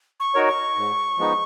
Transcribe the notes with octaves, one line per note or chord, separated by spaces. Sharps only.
C#6
D#4 F#4 A#4 C#5
C#6
G#2
F3 G#3 B3 D#4